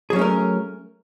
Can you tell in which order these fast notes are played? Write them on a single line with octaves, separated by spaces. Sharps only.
G#4 F#3 C#4 A3 A#4